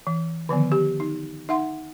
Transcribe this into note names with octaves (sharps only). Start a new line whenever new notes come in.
E3
D3 D#3 F3 B3
G4
D#4
D#4 E5 F#5 C6